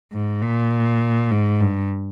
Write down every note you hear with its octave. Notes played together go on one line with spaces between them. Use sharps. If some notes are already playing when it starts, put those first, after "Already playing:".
G#2
A#2
G#2
G2